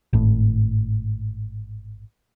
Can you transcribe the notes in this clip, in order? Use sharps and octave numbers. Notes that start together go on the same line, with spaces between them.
G#1 A2